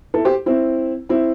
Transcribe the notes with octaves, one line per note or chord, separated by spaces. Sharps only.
E4 A4
G4 C5
C4 E4
C4 E4